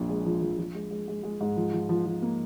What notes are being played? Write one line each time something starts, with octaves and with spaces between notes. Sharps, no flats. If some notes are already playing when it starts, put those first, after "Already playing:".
Already playing: A#1 A#2 F3
G#3
F3
F3
F3
G#3
G#3
G#3
G#3
G#2
F3
F3
F3
F3
A#3